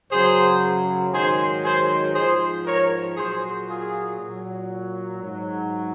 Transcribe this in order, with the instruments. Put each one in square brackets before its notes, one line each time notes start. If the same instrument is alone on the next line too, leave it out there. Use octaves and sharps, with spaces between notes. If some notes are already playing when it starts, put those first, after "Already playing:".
[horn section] F#2 C#3 F#3 G#4 C5
G#2 D#3 F#3 G#4 C5
G#4 C5
G#2 F3 G#4 C5
A#4 C#5
A#2 F#3 G#4 C5
F4 G#4
A#2 F#3
G#2 F#3